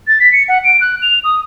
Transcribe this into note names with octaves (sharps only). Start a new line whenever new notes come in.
A6
B6
C#7
F#5
D7
F#6
F7
D#6